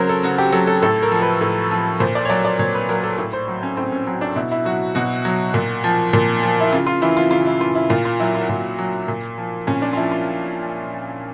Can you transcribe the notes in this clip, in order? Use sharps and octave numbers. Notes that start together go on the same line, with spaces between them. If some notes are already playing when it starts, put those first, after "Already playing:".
Already playing: C#3 F#3 A#4 C5 C#5
A4
C#3 F#4
G4
F#3 A4
A4
A2 A4
A#4
F3
B4
A2
F3
A#2 C5
D5
C#5
F#3 D5
D5
A#2 C#5
B4
F#3 A#4
A4
A2
C5
F#3
C#4
A2 C4
C#4
F#3 C#4
D4
B2 E4
E4
F#3 F#4
B2 F#4
F#3
A#2
F3
A#2
F3
E4
C#3 F4
F4
E3 E4
F4
C#3 F4
E4
E3 F4
E4
A#2 F4
F4
F#3 E4
F4
F#4
A#2 F4
F#3
A#2
F3
A#2 C#4
D4
F4
F3 E4
F4